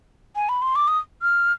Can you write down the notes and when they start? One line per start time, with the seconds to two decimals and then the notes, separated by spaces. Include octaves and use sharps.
0.36 G#5
0.49 B5
0.62 C6
0.76 D6
0.88 D#6
1.22 F6